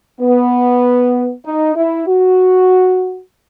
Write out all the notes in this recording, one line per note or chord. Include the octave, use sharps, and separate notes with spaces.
B3
D#4
E4
F#4